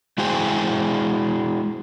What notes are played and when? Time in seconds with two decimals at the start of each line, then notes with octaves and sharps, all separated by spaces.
0.18 G#3 E4 F#4 G#4 C5 G5